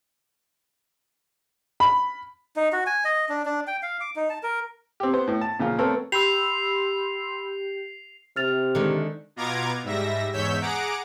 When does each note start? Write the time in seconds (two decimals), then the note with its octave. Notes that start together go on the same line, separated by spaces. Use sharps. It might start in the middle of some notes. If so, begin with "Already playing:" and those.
1.80 B5
2.56 D#4
2.72 F#4
2.86 G#5
3.04 D#5
3.29 D4
3.46 D4
3.67 G5
3.82 F5
4.01 D6
4.16 D#4
4.30 A5
4.43 A#4
5.00 C4 G4
5.13 B3 C5
5.27 A2
5.41 A5
5.59 A#2 C#3 F3 F4
5.78 A3 B3 C4 A4 A#4 C#5
6.12 G4 B5 C6 E6 C7 F7
8.36 C3 F6 A6 F7
8.75 D3 D#3 G#3
9.36 B2 B3 F4 A#5 D6 G#6
9.83 G#2 G3 E5 A#6
10.33 E2 G#2 C#5 E6 G6 B6
10.62 G#4 F#5 A#5 D6 D7